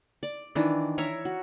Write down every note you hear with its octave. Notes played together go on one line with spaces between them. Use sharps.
D5
D#3 E3 D4
A#4 C#5 E5 A#5
F#4